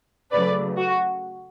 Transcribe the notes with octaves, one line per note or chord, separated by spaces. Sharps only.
C#3 F#3 A3 B4 D5
F#4